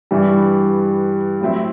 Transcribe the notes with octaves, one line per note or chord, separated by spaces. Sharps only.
G2 E3 G3
A2 F#3 C4 E4